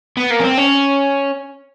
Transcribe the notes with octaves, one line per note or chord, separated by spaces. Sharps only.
B3
A#3
C#4
C4
C#4